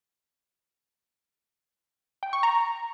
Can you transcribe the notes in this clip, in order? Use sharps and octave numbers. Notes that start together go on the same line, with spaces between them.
G5
C#6
A#5